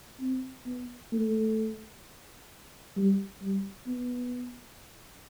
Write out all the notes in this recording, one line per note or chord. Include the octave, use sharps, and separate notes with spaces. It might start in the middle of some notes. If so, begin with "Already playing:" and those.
C4
B3
A3
G3
G3
B3